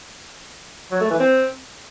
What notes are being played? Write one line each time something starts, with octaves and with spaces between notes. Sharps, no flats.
F#3
A3
E3
C4